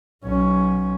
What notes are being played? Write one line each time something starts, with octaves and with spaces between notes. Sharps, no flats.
B1 C#4